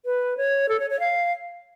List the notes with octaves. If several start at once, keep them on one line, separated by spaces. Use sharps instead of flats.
B4
C#5
A4
C#5
C#5
F5